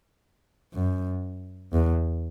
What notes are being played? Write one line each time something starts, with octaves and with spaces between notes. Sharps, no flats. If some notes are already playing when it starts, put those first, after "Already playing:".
F#2
E2